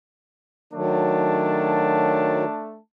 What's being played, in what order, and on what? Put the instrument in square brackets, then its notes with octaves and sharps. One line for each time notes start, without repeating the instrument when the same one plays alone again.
[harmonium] D#3 F#3 [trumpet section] A3 D4 A5